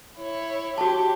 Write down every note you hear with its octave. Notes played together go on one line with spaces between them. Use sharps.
E4 C#5
F#4 G4 C#5 A5